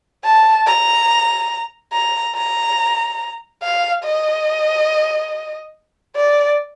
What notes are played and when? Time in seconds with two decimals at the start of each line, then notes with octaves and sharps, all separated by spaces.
0.24 A5
0.66 A#5
1.93 A#5
2.35 A#5
3.63 F5
4.04 D#5
6.16 D5